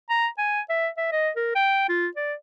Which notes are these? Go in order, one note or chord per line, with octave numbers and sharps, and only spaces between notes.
A#5
G#5
E5
E5
D#5
A#4
G5
F4
D5